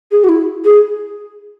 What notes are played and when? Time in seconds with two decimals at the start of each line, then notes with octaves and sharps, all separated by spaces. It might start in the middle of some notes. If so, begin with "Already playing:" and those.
0.12 G#4
0.24 F#4
0.29 E4
0.65 G#4